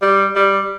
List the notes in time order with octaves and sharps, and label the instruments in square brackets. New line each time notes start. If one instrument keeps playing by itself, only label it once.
[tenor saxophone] G3
G3